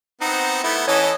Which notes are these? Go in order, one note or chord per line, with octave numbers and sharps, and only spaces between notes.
B3 C4 D#4 F#5
A3 B3 E4
E3 C#4 A4 C#5 D#5